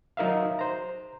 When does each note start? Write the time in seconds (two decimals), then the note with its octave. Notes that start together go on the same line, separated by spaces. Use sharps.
0.17 F#3 D#4 A#4 E5 F5
0.59 C5 A#5